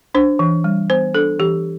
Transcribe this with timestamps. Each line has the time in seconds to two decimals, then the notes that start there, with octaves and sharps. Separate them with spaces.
0.15 D4 C5
0.39 E3
0.64 G3
0.90 B3 C5
1.15 D4 A4
1.39 E3 G4